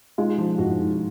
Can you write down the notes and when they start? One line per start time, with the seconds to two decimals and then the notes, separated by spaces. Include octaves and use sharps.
0.18 G#3 D#4 F4
0.38 F3
0.58 G#2 E4 F#4
0.78 G#2